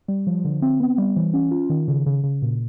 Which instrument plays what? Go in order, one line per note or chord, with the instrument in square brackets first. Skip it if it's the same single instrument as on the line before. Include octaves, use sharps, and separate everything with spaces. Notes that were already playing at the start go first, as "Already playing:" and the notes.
[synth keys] G3
F3
D3
C4
B3
G3
E3
C#4
F4
D#3
C#3
C#3
C#3
A#2